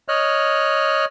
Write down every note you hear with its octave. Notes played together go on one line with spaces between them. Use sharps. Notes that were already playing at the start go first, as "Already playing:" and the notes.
C#5 D#5 F6 F#6